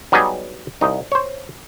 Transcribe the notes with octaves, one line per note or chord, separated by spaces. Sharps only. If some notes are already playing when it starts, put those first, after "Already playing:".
F#3 G3 B3 D#4 G#4
C2 D#4
C5 C#5